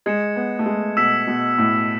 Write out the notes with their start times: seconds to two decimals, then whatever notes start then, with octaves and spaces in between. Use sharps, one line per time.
0.06 G#3 G#6 C#7 E7
0.36 B3
0.59 A3
0.66 G#3
0.97 B2 E6 B6 E7
1.27 B2
1.58 A2